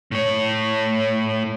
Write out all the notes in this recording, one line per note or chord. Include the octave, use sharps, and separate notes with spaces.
A2 C#5